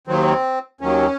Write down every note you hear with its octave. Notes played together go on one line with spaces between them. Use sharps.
D#2 D#3 F#3 C4
D#2 D#3 F#3 C#4